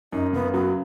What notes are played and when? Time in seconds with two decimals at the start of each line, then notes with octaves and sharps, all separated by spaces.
0.12 F#2 D#4
0.33 C#3 B3
0.54 F#3 B3